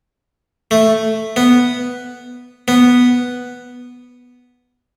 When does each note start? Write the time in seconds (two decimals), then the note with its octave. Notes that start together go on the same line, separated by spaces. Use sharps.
0.71 A3
1.36 B3
2.68 B3